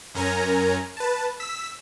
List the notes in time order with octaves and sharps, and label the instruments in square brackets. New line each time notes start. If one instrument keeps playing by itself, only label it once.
[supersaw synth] F#2 C#4 A#4 G#5 A#5
B4 A5
E6 B6